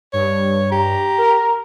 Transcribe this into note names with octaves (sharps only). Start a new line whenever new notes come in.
G2 C#5
G4 A#5
A#4